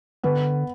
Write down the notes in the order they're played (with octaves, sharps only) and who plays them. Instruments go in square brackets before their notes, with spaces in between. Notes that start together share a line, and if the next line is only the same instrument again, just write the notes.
[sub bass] D3 [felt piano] B3 B4